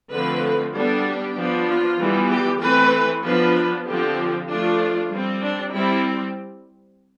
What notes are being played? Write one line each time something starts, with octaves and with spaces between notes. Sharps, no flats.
D3 F3 A3 C4 B4
G3 B3 D4 A4
G4
F3 B3 D4
F4
E3 G3 B3
G4
E3 A3 C4 B4
F3 B3 D4 B4
D3 F3 C4 G4
F3 A3 D4 F4
G3 C4
D4
G3 C4 E4